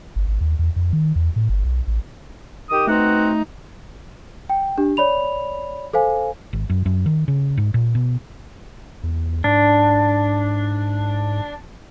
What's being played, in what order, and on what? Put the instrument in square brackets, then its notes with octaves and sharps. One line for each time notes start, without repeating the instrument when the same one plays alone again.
[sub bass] G1
G#1
D#2
E2
F2
D#3
E2
A2
G1
B1
A1
[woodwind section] D#3 G4 D#6
[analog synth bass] A3 [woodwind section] B3 C4 F#4 [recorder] D#4
[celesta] G5
D4 G4
C#5 D5 B5 F7
A4 C5 F5 G#5
[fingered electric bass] G#1
F#2
F#2
D#3
C#3
G#2
A#2
B2
[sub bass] E2
[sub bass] G#2 [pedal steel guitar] D4